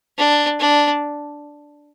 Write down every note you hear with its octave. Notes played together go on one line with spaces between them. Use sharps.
D4
D4